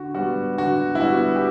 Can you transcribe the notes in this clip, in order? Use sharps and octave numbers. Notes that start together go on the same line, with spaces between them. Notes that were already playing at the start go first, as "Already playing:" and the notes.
Already playing: D3 F#4
G3 B3 F#4
D3 F#4
E4
G3 B3 F#4
G4